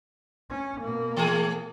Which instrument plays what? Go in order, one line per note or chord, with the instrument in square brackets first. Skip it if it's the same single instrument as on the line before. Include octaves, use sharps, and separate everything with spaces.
[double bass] C#4
B2 A#3
[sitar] E3 A3 G#4